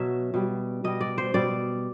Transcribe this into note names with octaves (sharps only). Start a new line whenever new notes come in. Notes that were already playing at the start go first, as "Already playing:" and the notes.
Already playing: B2 F#3 E5
B2 G3
B2 G3 D#5
D5
C5
B2 G3 D5